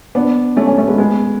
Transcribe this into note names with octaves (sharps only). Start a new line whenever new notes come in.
B3 D4
A3 C#4
A3 C#4
A3 C#4
G#3 B3
G#3 B3